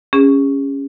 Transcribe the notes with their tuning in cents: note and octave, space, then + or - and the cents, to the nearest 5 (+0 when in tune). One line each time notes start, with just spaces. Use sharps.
C#4 +0 G#4 -35